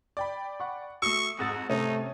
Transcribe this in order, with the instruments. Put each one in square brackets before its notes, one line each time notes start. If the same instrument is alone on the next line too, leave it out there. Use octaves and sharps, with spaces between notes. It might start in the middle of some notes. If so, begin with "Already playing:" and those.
[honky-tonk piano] D5 G5 B5
[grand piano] F#5 C#6
[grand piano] A3 F#4 [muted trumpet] C#6 [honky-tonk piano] D#6 E6
[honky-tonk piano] F2 G#2 [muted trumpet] F#4 [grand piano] D#6 E6 A6
[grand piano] C3 [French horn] A3 [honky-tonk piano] C#4 [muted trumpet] D#4